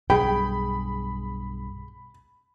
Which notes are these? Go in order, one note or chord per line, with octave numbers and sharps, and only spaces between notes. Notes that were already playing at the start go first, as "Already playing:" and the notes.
B1 G2 G#4 G5 B5